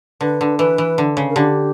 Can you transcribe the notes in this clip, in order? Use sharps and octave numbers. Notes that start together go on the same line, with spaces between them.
D3 B4
D3
E3 B4
E3
D3
C#3
A#4
D3 G4